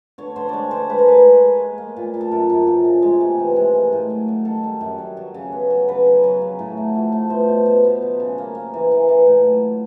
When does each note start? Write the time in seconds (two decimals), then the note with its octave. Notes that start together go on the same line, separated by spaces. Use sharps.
0.18 D3 C#5
0.36 D3 C5
0.49 G#3 C#5 D5
0.71 D3 C5
0.89 G#3 B4
0.98 A#4
1.06 G#3 B4
1.25 G#3
1.43 G#3
1.60 A#3
1.78 A#3
1.96 A#2
2.14 A#2
2.21 A4
2.31 F#2 A#4
2.50 F#2
2.67 F3
2.85 C#3
3.02 G#3
3.21 C3
3.39 E3
3.56 G#3
3.74 A#3
3.93 A2
4.10 F#3
4.28 F#3
4.45 D#3 A4
4.64 G3
4.81 F#2
4.98 F#2
5.17 F#3
5.34 C#3
5.52 B3
5.70 F#3
5.88 C#3 B4
6.06 F#3
6.24 F#3
6.42 C#3
6.59 A2
6.77 A3
6.95 F3
7.12 A3
7.30 B3 C5
7.49 B2
7.66 B2
7.84 B3
8.02 F#3
8.20 C#3
8.38 A#3
8.55 A#3
8.74 E3
8.92 E3
9.09 E3
9.27 A2
9.44 F#3